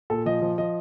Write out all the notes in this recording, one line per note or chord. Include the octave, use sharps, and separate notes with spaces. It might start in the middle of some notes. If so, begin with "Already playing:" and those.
A#2 A4
F3 D#5
F3
F3 D#5